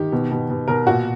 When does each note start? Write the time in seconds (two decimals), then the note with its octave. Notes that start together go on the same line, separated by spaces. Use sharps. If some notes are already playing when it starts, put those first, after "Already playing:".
Already playing: D#3 G4
0.12 B2
0.31 B2
0.50 B2
0.68 B2 A#4
0.87 A#2 F#4